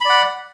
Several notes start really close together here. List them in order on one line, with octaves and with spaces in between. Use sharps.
B5 D5 F#5